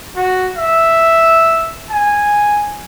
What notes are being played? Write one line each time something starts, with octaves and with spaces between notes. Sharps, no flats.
F#4
E5
G#5